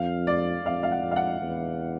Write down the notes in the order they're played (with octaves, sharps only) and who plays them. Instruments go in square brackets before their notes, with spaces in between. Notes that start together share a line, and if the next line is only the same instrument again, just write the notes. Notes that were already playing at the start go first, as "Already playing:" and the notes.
Already playing: [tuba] F2 [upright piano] F5
[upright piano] D5
[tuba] F2 [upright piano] F5
[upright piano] F5
F#5
[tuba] F2
[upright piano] F5
F#5
[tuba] E2